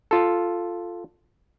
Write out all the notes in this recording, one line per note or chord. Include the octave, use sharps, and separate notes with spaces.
F4 A4